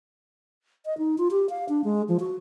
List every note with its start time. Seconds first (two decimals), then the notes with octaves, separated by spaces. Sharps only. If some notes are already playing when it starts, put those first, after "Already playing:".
0.85 D#5
0.98 D#4
1.18 F4
1.31 G4
1.50 F5
1.69 D4
1.84 G#3
2.09 F3
2.20 F#4